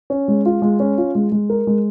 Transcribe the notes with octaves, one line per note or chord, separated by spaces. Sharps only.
C#4
G#3
F4
G#3
C#4
F4
G#3
G#3
A#4
G#3